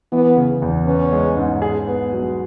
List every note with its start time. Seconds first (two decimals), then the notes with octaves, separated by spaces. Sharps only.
0.12 E3 B3
0.37 C#3
0.62 E2
0.86 B3 C#4
1.12 G#3
1.37 G#2
1.62 G#4
1.88 B3
2.13 F#3